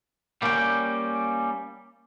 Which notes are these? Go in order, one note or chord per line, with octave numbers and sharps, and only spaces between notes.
G3 A#3 C#4 D5 G5